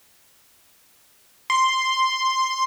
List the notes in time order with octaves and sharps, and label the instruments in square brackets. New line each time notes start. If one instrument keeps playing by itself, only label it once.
[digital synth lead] C6